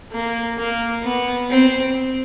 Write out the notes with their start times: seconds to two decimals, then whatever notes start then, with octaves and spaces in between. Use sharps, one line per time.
0.12 A#3
0.58 A#3
1.04 B3
1.50 C4